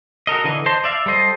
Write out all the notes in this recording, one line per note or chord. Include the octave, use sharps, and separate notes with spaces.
F#4 A4 A#4 D#5
D3 E3 D#5
C5 D#5 A5 C6
D5 E5 F5
G3 A4 C5 D#5